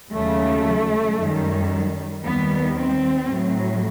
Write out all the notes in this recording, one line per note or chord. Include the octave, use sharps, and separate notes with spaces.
D#2 C#3 F#3 A3
F#2 D#3 G3
D#2 D#3 G3 B3
C4
A2 F#3